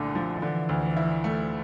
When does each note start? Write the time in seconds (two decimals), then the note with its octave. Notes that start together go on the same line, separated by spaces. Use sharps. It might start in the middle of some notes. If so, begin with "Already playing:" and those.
Already playing: C2 A#2 D3 A3
0.15 F3
0.42 D3 E3
0.69 D2
0.97 E4
1.24 A3